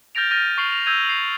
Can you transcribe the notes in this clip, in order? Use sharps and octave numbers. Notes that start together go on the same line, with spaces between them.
F6 G6 A6 A#6 D7 F7
F6 G6 A6 A#6 D#7
C#6 F6 C7 D7 F7 F#7
F7
E6 G6 G#6 D#7 F7
C7 F7 F#7